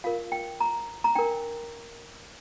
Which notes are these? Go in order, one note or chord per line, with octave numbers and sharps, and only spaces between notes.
F4 A#4 F5
G5
A#5
A#5
D4 A#4 G5